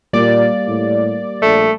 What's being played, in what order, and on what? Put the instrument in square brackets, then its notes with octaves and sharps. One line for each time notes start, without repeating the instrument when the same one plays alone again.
[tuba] A#2 [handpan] G3 A#3 [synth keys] D5
[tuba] A2
[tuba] A#1 [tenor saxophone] A3